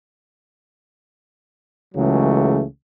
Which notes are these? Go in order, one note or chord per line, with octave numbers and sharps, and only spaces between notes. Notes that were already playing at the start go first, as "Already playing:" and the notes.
C#2 C#3 E3 F#3 G#3 A3